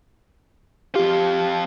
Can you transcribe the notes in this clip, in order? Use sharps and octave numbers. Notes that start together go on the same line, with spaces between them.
F2 F4 G4